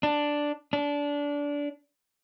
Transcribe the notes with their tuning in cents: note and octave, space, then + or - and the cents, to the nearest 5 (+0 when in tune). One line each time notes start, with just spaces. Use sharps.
D4 +0
D4 -20